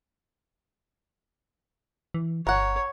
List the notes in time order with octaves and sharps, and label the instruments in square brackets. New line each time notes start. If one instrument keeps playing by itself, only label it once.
[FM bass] E3
[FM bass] G1 [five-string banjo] A#4 F#5 [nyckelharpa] C#5